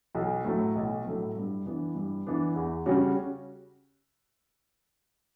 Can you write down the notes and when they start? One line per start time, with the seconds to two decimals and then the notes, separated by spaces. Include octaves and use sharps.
0.15 B1
0.45 A2 F#3 A3
0.76 B1
1.05 A2 F#3 A3
1.36 G2
1.66 E3 B3 D4
1.95 G2
2.27 E3 B3 D4
2.56 E2
2.86 C#3 G3 C#4 F#4